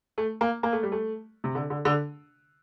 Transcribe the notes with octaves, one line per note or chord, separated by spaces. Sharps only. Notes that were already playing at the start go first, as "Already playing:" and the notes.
A3
A#3
A#3
A3
G3
A3
C3
D3
D3
D3